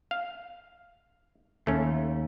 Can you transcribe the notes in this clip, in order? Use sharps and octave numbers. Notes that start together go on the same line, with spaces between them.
F5
D#2 A3 C#4